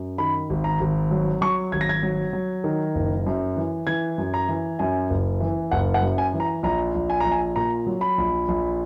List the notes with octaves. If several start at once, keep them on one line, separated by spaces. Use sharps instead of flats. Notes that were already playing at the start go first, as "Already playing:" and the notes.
Already playing: F#2
D#3 B5
G#1
A#5
G#1
F#3
F#3 C#6
G#1 G#6
A#6
G#6
F#3
F#3
D#3
F#1
F#2
E3
E3 G#6
F#2
A#5
E3
F#2 G#5
F#1
E3
F#1 F#5
F#5
F#2
G#5
E3
A#5
A#1 A#5
A#1
G#5
A#1 A#5
G#5
A#2 A#5
F#3
B5
A#1
A#1